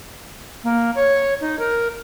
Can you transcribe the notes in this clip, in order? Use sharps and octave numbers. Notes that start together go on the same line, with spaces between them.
A#3
C#5
D#4
A#4